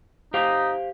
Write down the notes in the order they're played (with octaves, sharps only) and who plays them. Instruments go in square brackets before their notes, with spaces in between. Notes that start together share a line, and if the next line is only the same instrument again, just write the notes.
[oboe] D#4 [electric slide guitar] G4 C5 F5